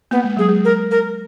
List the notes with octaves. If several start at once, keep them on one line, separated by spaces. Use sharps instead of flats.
A#3 B3
G#3
F#3 G#4
G#3
A#4
A#4